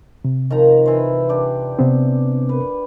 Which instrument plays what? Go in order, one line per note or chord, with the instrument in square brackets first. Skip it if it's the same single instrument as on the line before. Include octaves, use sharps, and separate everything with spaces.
[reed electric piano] C3
[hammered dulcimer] D#3 F3 A#5
E3 C5
D4 G4
[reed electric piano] C3 B3 C4
[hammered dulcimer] B4